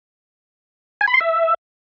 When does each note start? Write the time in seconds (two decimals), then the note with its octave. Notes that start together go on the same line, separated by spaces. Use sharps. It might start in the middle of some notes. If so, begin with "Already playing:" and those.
1.01 G#5
1.07 B5
1.14 C6
1.21 E5